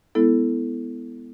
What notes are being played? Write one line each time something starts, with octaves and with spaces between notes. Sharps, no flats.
G#3 B3 E4 A4